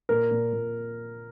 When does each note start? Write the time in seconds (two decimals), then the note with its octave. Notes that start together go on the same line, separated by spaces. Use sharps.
0.09 A#2 A#4
0.31 A#2
0.53 A#2